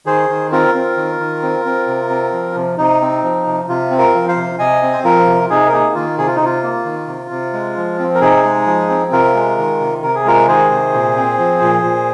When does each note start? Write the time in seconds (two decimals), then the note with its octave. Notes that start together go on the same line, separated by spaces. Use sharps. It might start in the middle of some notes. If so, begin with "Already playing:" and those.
0.06 D#3 G#4 C5
0.29 D#3
0.52 C4 F4 A#4
0.75 C4
0.97 D#3
1.20 D#3
1.43 C4
1.65 C4
1.87 C3
2.10 C4
2.32 F3
2.56 C3
2.78 C3 D#4
3.01 C4
3.24 F3
3.46 C3
3.69 C3 F4
3.91 C4
3.98 F4 A#4
4.15 F3
4.29 C5 F5
4.36 C3
4.59 C3 D#5 G#5
4.83 C4
4.94 C5
5.04 F3 F4 A#4
5.27 C3
5.50 C3 D#4 G#4
5.68 A#4
5.72 A#3 D#4 G#4
5.95 D#3 F4
6.18 C3 G#4
6.27 F4
6.35 D#4
6.41 C3 F4
6.63 A#3
6.85 D#3
7.08 C3
7.31 C3
7.53 G#3
7.77 F3
7.99 C4
8.15 A#4
8.21 C3 D#4 G#4
8.44 G#3
8.66 F3
8.90 C4
9.12 C3 F4 A#4
9.34 G#3
9.58 D#3
9.80 C3
10.03 C3 A#4
10.15 G#4
10.25 G#3 F4 A#4
10.48 D#3 G#4 C5
10.71 C3
10.94 A#2
11.16 C4
11.39 F3
11.61 A#2
11.83 A#2